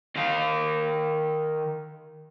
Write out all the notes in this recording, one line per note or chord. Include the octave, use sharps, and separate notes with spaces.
D#3 F5